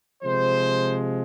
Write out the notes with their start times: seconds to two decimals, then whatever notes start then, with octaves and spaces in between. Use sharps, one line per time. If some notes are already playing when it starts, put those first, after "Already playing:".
0.23 C3 F3 G#3 C5